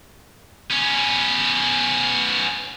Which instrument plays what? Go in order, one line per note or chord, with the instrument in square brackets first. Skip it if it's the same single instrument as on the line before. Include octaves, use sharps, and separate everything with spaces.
[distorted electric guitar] B3 C#4